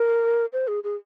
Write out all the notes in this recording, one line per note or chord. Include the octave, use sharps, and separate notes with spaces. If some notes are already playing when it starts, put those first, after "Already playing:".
Already playing: A#4
C5
G#4
G#4